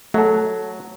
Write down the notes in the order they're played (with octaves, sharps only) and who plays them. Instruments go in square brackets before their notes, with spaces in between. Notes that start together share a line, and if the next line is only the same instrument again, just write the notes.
[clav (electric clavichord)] F#3 [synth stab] A3 A4